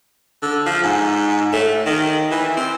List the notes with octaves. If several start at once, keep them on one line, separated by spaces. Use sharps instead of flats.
D3
F3
G#2
A3
D#3
E3
C4